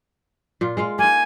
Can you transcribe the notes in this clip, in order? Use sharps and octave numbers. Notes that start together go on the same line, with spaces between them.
A#2 F4
G#3 F4 F5
A#3 D#4 G#5